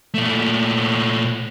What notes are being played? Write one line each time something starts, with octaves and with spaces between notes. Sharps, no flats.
A#2 A3